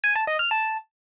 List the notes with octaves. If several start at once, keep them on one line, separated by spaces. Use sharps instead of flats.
G#5
A5
D#5
F6
A5